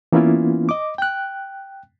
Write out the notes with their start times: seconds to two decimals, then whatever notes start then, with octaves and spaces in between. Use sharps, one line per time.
0.12 E3 A#3 B3 C#4 E4 F4
0.69 D#5 D6
0.98 G5 F#6